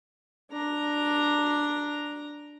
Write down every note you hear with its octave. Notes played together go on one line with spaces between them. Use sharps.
D4 A#5